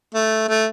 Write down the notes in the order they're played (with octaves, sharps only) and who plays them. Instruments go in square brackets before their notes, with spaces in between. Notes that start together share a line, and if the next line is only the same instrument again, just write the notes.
[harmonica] A3
A3